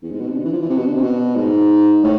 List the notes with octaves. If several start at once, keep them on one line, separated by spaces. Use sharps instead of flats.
E2
G#2
B2
C3
D3
E3
F3
E3
C3
B2
D3
C3
B2
G#2
A2